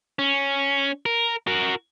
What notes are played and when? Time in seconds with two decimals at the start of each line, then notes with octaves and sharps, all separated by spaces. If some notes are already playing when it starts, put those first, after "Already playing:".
0.19 C#4
1.06 A#4
1.47 F#4 A#4